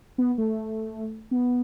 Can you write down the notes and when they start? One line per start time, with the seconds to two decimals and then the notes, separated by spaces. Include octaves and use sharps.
0.18 B3
0.38 A3
1.31 B3